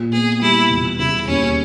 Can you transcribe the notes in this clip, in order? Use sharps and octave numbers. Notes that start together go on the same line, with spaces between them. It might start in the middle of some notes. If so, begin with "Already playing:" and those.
Already playing: A#2
B3 G#4
G3 E4
E1
C#3 E4
D#2 C#4